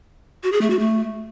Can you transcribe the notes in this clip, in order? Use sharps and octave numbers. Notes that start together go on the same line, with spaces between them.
F#4
G#4
A3
F#4
A3